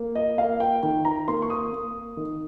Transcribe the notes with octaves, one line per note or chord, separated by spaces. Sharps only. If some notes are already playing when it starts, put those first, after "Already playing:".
Already playing: A#3
D#5
A#3 F5
G5
D#3 G5
A#5
A#3 C6
C#6
D#6
A#3
D#3